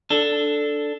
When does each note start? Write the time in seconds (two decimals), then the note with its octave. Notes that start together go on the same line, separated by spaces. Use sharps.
0.10 D4 A4